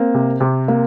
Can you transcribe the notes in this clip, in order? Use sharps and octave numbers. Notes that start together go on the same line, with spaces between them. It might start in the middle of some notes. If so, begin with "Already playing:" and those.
Already playing: A#3 C4
C3
C3
A#3